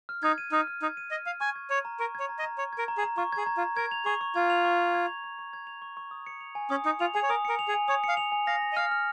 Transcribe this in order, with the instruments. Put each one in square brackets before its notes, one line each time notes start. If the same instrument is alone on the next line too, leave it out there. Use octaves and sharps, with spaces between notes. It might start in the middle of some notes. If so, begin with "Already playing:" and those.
[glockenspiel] F6
[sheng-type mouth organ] D#4 [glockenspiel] G#6
[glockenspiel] D#7
[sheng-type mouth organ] D#4 [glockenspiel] F6
[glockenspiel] F6
[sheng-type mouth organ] D#4 [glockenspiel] G#6
[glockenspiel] D#7
[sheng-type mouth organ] D#5 [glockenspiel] F6
[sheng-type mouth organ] F5 [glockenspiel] F6
[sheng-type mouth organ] G#5 [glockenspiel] C#6
[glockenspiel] G#6
[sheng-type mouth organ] C#5 [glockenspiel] A#5
[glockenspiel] A#5
[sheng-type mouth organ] A#4 [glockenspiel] C#6
[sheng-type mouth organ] C#5 [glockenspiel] G#6
[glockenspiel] A#5
[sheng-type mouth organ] D#5
[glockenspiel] A#5
[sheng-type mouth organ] C#5 [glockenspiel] C#6
[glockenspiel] G#6
[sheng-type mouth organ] A#4
[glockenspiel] A#5
[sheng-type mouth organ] G#4
[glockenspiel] A#5
[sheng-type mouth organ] F4 [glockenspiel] C#6
[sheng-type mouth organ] G#4 [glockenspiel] G#6
[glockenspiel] A#5
[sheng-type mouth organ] F4
[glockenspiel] A#5
[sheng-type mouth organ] A#4 [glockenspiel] G#6
[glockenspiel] F7
[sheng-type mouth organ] G#4 [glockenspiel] C#6
[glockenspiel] C#6
[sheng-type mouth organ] F4 [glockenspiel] G#6
[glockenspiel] F7
C#6
C#6
G#6
F7
C#6
C#6
G#6
F7
C#6
C#6
D#6
C#7
F7
G#5
[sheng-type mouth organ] C#4 [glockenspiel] D#6
[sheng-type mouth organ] D#4 [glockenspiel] C#7
[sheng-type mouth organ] F4 [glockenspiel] F7
[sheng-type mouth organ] G#4 [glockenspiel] G#5
[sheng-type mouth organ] C#5
[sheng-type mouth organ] A#4 [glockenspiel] D#6
[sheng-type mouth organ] A#4 [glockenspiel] C#7
[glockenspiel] F7
[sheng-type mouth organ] G#4
[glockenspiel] G#5
[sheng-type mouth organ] C#5 [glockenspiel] D#6
[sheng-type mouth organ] F5 [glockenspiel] C#7
[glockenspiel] F7
G#5
[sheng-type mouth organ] F5 [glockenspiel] A#6
[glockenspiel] F7
[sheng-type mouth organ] D#5
[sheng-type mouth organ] F5 [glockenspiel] F6
[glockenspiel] F6